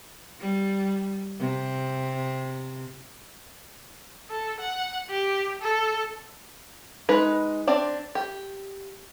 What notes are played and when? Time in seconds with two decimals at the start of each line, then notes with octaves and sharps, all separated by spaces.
0.40 G3
1.39 C3
4.30 A4
4.60 F#5
5.10 G4
5.61 A4
7.09 G#3 D#4 B4
7.67 C4 D4 D5
8.15 G4